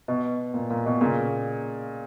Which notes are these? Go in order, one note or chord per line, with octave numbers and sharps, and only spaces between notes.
B2
A#2
A#2
B2
A#2 C#3